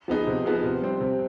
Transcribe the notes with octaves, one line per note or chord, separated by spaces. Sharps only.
F3 B3 D#4 G#4
C3
F3 B3 D#4 G#4
C3
G3 C4
C3